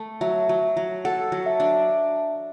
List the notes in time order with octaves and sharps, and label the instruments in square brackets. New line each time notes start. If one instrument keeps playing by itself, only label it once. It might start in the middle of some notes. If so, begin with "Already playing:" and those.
Already playing: [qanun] A3
[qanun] F#3 [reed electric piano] E5
[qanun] F#3
F#3
[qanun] A4 [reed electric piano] F#5
[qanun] F#3
[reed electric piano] E5
[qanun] D4